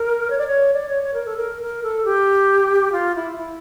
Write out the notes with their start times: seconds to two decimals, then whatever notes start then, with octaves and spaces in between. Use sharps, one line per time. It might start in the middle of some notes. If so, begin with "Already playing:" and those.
Already playing: A#4
0.30 C#5
0.38 D5
0.47 C#5
0.74 D5
0.88 C#5
1.03 C#5
1.14 A#4
1.26 A4
1.37 A#4
1.62 A#4
1.83 A4
2.05 G4
2.92 F4
3.15 E4
3.36 E4